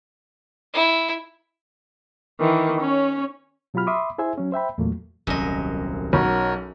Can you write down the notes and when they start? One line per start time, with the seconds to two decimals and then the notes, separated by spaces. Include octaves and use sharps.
0.74 E4
2.40 D#3 E3
2.80 C#4 C#5
3.74 B2 F#3 F4 G4 B5 F6
3.87 E5 B5 C6 D6 D#6
4.18 E4 G#4 C5 E5 G#5
4.38 F#3 C#4
4.52 C5 E5 G5 B5
4.78 E2 A#2 F#3 A3 A#3
5.27 D#1 C2 F#2 D#5
6.13 B1 F#4 A#4 C#5